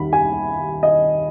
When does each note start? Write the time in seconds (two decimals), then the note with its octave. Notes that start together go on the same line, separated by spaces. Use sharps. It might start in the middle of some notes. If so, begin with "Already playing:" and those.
Already playing: D#2 D#3 B5
0.13 G#5
0.83 D#5